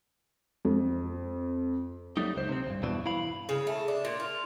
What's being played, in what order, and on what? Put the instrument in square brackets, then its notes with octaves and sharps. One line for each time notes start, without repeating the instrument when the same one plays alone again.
[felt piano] F2
[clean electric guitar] F#3 G3 A3 A#3 D#4
C#2 C5
C3 C4
D2 G2
E2 G2 B2 E3 D4
E4 F5 B5
[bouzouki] C#3
A3
D4
A#2
F4